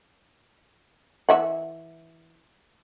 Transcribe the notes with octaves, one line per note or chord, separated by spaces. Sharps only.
E3 E5 F#5